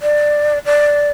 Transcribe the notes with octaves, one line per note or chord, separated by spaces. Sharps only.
D5
D5